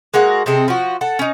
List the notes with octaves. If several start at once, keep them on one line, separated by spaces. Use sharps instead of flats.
G#3 A#3 F#4 A#4
C3 G#3 C4 A4
F3 F#4
A4 F#5
C#4 D#4